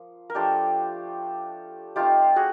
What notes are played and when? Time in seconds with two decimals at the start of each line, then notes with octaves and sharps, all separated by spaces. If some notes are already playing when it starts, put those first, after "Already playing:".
Already playing: F3 A#3
0.30 A#4
0.35 F3 A3 D4 F4 G4 A4
1.96 A3 C4 D#4 F4 G4
2.36 F#4 G#4